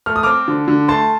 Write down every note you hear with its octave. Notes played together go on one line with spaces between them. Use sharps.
A3 F6
D#6
C4 D6 F6
D3
D3
A3 A5 C6